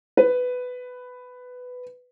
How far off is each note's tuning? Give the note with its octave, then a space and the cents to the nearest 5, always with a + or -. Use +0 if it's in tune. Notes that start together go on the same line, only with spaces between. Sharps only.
B4 +10